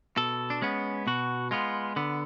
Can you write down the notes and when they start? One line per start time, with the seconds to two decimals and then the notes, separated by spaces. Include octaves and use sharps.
0.17 B2 A4
0.50 D4
0.62 G#3 B3 C#4
1.07 B2 F#4
1.51 G#3 B3 F4
1.96 D3 B3